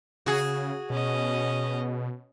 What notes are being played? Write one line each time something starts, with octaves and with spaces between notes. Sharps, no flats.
C#3 F#4 G#4
B2 C#4 D#5